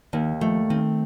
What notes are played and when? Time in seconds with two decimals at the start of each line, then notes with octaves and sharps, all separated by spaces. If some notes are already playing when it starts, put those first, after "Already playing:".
0.13 D#2 D#3
0.41 F3 A3
0.70 D#3 C4